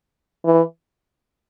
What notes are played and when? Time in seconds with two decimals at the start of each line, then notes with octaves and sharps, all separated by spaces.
0.45 E3